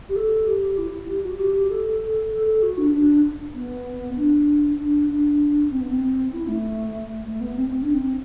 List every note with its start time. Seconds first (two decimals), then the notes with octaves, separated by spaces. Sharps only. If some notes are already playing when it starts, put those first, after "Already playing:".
0.09 G4
0.16 A4
0.47 G4
0.78 E4
1.08 G4
1.24 F#4
1.39 G4
1.70 A4
2.32 A4
2.47 A4
2.63 F#4
2.78 D4
2.93 D4
3.55 B3
4.17 D4
4.78 D4
5.09 D4
5.71 C4
5.81 B3
5.90 C4
6.33 E4
6.48 A3
7.25 A3
7.41 B3
7.56 C4
7.71 C4
7.83 D4
7.94 C4